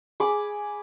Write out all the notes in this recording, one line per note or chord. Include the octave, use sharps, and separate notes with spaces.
G#4 B5 D6